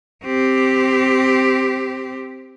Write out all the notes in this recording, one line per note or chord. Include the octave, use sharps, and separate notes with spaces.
C4 G4